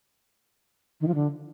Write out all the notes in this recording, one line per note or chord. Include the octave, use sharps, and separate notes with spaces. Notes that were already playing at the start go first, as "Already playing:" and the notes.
D#3
F3
D3